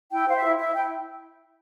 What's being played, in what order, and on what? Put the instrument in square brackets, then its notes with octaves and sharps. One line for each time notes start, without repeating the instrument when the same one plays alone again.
[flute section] E4 G5
C5 F5
E5
E4
E4 E5
E4 G5